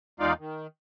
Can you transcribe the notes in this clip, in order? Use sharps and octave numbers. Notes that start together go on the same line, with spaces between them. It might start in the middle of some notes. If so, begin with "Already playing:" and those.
E2 G#3 D#4 F4 D5 F5
D#3